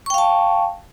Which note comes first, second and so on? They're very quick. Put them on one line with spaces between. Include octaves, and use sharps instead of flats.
C#6 G5 F5 A5